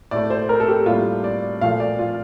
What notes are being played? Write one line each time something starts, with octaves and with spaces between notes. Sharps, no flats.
A2 A3 D5
C5
A#4
A4
G4
A2 G3 A#3 F4
D5
A#2 F3 A3 F5
D5
F4